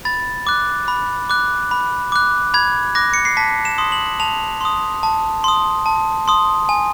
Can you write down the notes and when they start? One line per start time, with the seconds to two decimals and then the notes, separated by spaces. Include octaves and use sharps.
0.05 B5 A6
0.47 D6 F#6
0.88 B5
1.30 D6 F#6
1.71 B5
2.12 D6 F#6
2.54 B5 G#6
2.95 D6 F#6 A#6
3.14 C#7
3.25 C7
3.37 A5 B6
3.65 E7
3.78 C6 D#6
3.92 F#7
4.20 A5 F7
4.61 C6 D#6
5.03 A5
5.44 C6 D#6
5.86 A5
6.28 C6 D#6
6.69 G#5